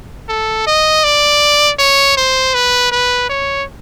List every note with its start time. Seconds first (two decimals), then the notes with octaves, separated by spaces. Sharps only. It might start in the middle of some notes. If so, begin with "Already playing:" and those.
0.29 A4
0.67 D#5
1.04 D5
1.79 C#5
2.17 C5
2.54 B4
2.92 B4
3.29 C#5